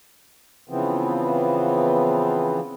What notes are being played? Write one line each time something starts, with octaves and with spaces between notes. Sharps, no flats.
C#3 E3 F3 B3 C4